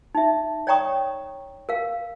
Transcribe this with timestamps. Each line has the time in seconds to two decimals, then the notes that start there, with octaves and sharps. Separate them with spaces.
0.15 D#4 E5
0.67 C#5 D5 G5 A#5 C#6 D#6
1.69 A#4 F5